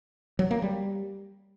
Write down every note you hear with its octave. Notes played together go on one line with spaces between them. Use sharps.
F#3
A#3
G3